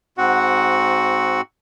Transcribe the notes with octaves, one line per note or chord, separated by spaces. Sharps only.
G#2 C4 F#4 F#5